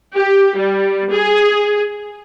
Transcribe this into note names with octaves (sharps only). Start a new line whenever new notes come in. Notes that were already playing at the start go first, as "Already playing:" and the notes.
G4
G3
G#4